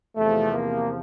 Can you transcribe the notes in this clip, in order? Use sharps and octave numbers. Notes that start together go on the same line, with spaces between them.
E2 C3 F3 A3
A#3